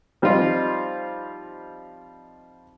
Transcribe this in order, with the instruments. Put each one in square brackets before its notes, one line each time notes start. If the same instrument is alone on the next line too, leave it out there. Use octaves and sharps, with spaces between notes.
[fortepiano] F3 G3 C4 D#4 F4